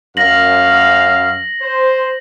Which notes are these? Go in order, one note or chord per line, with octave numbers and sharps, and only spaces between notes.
F#2 F5 A#6 F#7
C5